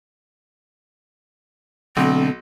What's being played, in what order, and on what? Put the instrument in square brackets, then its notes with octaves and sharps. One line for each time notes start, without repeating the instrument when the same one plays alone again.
[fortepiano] B1 [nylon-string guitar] B2 D3 A3 [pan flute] C4